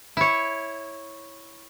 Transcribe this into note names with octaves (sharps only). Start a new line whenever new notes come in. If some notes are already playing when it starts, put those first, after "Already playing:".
E4 C#5